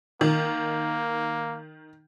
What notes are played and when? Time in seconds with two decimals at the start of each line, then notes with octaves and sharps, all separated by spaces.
0.21 D#3 A#3